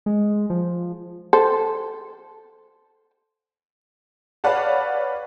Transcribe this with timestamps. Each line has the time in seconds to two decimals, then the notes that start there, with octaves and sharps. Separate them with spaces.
0.06 G#3
0.50 F3
1.33 A4 C5
4.44 B4 C#5 D5 F5 F#5 A5